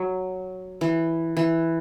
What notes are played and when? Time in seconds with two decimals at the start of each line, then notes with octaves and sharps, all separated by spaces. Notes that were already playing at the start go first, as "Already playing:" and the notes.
Already playing: F#3
0.81 E3
1.37 E3